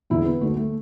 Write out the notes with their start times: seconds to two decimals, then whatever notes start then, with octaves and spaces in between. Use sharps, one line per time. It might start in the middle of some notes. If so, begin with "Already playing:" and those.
0.10 E1 E2 D3 E4
0.26 B3
0.41 D2 D3 A3
0.56 A3